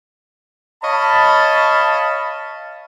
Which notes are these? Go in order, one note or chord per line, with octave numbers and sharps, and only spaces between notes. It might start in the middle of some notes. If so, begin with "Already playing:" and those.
C#5 D#5 F5 A5 B5